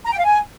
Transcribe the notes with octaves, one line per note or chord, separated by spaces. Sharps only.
A#5
G5
F5
G#5